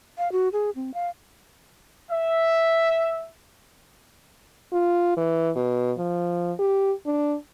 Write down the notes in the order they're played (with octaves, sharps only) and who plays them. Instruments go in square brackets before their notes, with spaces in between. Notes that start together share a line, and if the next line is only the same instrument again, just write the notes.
[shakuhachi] F5
F#4
G#4
C4
F5
[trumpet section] E5
[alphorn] F4
E3
B2
F3
G4
D4